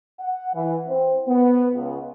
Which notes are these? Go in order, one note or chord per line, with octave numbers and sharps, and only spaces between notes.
F#5
E3
C4
B3
C#2